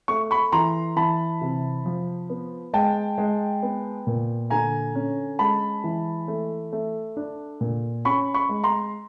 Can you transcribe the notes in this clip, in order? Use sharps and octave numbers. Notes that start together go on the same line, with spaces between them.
A3 C#6
B5 C#6
E3 A#5 C6
E3 A5 B5
C3
F3
B3
G#3 G5 A5
G#3
B3
A#2
D3 G#5 A#5
C#4
G#3 A5 B5
E3
A3
A3
D4
A#2
C#4 B5 C#6
B5 C#6
G#3
A#5 C6